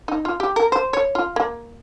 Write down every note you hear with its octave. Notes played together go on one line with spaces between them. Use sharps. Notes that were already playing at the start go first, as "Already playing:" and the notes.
D#4
F4
G4
A#4
C5
C#5
F4
A#3